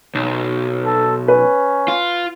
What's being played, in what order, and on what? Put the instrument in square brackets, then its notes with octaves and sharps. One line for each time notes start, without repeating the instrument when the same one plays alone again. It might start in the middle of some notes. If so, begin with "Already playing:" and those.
[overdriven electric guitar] B1
[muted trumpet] A4
[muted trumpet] C#4 [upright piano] B4
[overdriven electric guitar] F4